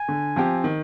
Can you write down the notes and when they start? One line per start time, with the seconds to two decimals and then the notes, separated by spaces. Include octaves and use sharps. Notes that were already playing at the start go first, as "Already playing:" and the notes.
Already playing: G#5
0.08 D3
0.36 F3 C4 G4
0.64 D#3